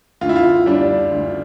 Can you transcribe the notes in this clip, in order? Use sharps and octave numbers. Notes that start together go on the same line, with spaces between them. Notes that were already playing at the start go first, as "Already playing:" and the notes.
D2 F4
E4
F4
G3 D4
D2